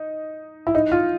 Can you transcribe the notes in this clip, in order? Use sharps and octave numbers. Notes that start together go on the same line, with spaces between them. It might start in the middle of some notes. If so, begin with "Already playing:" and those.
Already playing: D#4
E4
D#4
F4